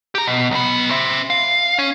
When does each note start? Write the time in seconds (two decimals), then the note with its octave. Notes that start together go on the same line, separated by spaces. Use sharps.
0.15 G4 A#5
0.27 B2
0.51 B1 B3
0.91 C5 E5
1.30 F5
1.79 C#4